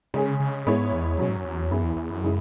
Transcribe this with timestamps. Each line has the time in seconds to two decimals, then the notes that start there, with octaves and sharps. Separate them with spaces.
0.14 C#3 G#3 C#4 G#4
0.39 C#3
0.66 G#2 G#3 B3 E4 C#5
0.93 E2
1.18 B2 F#3 C#4 F#4 C#5
1.29 G#2
1.37 F#2
1.45 E2
1.71 F#2 E3 B3 E4 G#4
1.83 E2
1.96 E2
2.10 F#2
2.23 C#3 G#3 E4